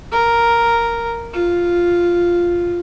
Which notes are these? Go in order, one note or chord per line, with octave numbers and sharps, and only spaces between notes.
A#4
F4